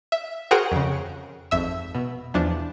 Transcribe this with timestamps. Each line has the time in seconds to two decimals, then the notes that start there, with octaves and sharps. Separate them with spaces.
0.12 E5
0.51 F#4 G#4 A#4 C5 F#5 G5
0.72 F2 C#3
1.51 G#1 F2 E5 E6
1.95 B2
2.34 E2 F3 D4